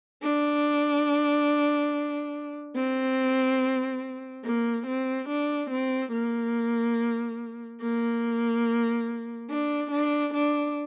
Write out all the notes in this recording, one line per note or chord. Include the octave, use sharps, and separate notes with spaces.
D4
C4
A#3
C4
D4
C4
A#3
A#3
D4
D4
D4